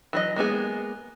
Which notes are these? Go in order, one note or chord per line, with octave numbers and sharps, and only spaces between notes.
E3 F#3 D#5
G#3 A#3 B3 G#4